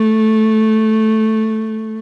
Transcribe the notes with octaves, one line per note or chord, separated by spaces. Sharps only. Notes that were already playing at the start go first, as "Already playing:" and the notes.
Already playing: A3